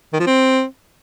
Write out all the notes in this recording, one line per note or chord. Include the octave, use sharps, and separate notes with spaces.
D#3
F3
C4